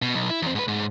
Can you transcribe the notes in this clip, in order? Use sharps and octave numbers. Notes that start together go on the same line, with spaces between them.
B2
B1
E4
E2 C4
G#2 B4
G#2